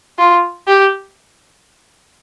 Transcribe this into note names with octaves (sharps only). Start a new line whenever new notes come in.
F4
G4